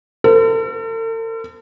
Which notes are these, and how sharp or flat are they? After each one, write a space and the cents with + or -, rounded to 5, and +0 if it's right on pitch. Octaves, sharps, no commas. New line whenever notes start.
A4 +45 C5 -45